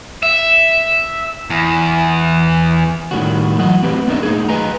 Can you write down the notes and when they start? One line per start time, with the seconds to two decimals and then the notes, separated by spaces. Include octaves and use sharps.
0.23 E5
1.50 E2
3.11 A2 D#3 G3 C#4 F#4
3.59 E3 F#3 D#5 F#5
3.82 A3 B3 C4 G4 B4
4.08 B3 D4 D#4 A#4 D#5 E5
4.23 A3 D#4 G#4
4.49 B4 D#5 G#5 A#5